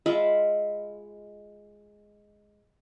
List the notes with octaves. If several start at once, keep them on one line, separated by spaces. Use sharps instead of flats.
G#3 F4 E5 B5